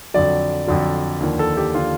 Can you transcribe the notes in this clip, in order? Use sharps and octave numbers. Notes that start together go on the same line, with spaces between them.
F2 D3 F#3 D5
F2 D3 F#3
D#2 D3 F3
A4
G4
D3 F3 F4